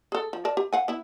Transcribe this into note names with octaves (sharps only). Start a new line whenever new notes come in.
G#4 A4
F3
A#4 D5 A5
G4
F5 F#5 G#5
B3 E4